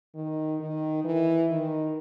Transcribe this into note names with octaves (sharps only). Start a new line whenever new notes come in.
D#3
D#3
E3
D#3